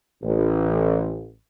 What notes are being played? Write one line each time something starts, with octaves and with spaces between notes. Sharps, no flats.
A1